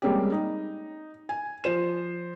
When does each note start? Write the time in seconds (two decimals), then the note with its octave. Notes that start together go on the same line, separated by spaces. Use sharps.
0.02 G3 G#3 A#3 C4 C#4 G4
0.32 D#4
1.29 G#5
1.64 F3 C5 E7